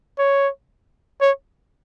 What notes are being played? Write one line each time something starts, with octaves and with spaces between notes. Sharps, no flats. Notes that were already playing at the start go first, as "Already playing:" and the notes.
C#5
C#5